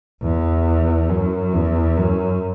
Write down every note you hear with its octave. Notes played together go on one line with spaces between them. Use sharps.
E2
F#2
E2
F#2